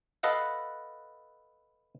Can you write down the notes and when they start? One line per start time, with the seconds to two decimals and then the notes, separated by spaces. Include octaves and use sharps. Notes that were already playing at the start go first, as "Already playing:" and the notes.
0.23 A4 B4 D#5 F5 F#5